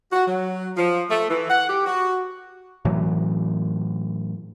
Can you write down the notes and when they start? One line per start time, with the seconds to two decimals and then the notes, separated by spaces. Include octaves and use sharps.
0.13 F#4
0.26 F#3
0.76 F3
1.10 A3
1.30 E3
1.49 F#5
1.69 G4
1.86 F#4
2.85 A2 E3 F#3